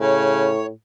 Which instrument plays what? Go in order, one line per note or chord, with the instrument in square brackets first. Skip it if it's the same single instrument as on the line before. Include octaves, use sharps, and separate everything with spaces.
[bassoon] A2 [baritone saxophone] C#3 [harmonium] C#5